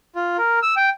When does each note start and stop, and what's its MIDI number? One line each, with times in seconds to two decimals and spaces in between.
0.15 0.37 65
0.38 0.59 70
0.62 0.75 88
0.76 0.90 79